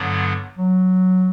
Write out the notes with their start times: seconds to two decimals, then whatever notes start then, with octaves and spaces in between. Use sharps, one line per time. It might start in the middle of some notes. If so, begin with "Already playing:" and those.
Already playing: G2 D3 F#3 B3
0.57 F#3